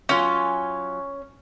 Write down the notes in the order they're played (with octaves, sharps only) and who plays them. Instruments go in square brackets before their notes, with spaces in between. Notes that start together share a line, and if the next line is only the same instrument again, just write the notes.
[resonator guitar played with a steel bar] F#3 F4 [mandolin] C#4 G#5